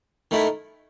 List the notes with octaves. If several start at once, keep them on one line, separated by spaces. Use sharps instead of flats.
D#3 A3 E4